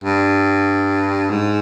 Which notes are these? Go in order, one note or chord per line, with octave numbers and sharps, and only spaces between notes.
G2
G#2